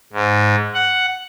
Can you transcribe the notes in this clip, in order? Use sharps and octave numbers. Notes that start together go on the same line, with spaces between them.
G#2
F#5